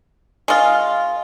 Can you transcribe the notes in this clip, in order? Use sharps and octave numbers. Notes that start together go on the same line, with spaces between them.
G#3 F4